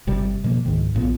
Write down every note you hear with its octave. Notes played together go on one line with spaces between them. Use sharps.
G1 C3 G3
B2 F3 F#3 A#3
C#2 G#2 D#3
A#1 A#2 F3 B3